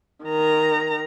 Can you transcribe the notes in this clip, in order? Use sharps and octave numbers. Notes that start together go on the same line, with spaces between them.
D#3 A#5